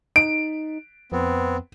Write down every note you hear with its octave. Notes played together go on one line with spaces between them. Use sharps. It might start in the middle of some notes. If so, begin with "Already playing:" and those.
D#4 D7
F2 B3 C4